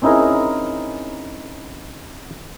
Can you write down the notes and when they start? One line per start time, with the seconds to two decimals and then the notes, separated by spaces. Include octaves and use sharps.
0.02 C4 C#4 D#4 E4 G#4 A#4